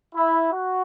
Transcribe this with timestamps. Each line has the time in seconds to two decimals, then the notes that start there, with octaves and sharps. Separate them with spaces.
0.15 E4
0.53 F#4